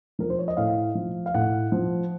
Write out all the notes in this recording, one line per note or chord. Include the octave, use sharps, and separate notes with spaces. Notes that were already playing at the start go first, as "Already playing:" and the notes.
F3 A#4
C5
C#5
D#5
A2 F5
F3
F5
A2 F#5
F3